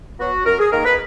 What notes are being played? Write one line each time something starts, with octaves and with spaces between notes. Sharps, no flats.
F#3 B3 F#4
F#2 A#4
G#4
D#3 A#3 A#4
B4